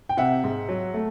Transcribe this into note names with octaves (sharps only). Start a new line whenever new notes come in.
G5
C3 E5 F#5
G#2
F#3
A3